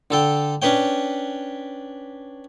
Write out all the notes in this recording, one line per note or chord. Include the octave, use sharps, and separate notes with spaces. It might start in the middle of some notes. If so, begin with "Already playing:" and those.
D3 A4 G5
C#4 D4 B4 C#5 G5